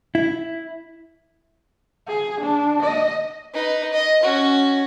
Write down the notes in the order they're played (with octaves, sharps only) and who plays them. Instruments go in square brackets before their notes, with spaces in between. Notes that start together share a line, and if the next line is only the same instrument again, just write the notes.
[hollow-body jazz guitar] E4
[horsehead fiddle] G#4
D4
D#5
[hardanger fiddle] D#4 B4
D#5
C#4 F#4